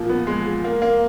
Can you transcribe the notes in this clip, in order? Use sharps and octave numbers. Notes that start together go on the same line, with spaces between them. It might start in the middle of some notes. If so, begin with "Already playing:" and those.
Already playing: A#2 F3
B3
G#3
G#3
A#3
A#3